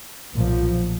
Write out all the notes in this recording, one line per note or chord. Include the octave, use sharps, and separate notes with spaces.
B1 A#2 F3